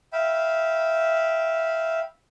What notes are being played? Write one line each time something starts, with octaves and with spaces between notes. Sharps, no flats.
E5 F5 G5 B5